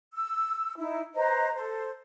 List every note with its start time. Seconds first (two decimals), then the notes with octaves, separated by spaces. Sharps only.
0.14 E6
0.78 D#4 E4
1.14 B4 C5 D#5 A#5
1.54 A4 C5